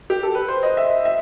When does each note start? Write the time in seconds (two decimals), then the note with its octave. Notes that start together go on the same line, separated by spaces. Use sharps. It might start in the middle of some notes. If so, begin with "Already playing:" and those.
0.10 G4
0.23 A4
0.35 B4
0.48 C5
0.63 D#5
0.77 E5
1.05 E5